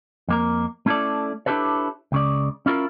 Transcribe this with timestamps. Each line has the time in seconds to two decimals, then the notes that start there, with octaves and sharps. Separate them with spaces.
0.28 F2 A#3 A#4
0.86 A3 C#4 E4 G#4 A4 D5
1.46 D4 E4 G4 A4 B4 C#5
2.12 C#2 C#3 D5
2.66 C#4 E4 F4 A#4